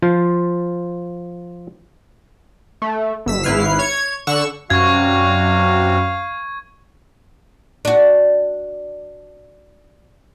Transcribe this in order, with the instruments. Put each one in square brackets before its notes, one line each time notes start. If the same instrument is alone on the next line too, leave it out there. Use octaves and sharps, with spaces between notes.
[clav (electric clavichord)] F3 F4 C5
[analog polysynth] A3
G1 E6 B6
G#1 G#2 E4 B4 F6 C7
C#5 G#6
D3 F#5 C#6 E6 C#7 E7
[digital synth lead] F#2 [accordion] C3 G3 F#4 [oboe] F5 [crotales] C#6 G#6
[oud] D4 F#4